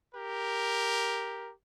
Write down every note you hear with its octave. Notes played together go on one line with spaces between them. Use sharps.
G4 A#4